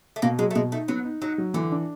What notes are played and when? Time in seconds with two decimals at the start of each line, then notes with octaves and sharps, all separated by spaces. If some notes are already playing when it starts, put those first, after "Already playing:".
0.16 A3
0.22 B2 A#3
0.39 F#3 G#3
0.51 A3
0.55 B2 G#3
0.72 A3 D#4
0.88 F#3 B3
1.05 D#4
1.22 F#3 D#4
1.38 F#3
1.54 D3 E3
1.72 D4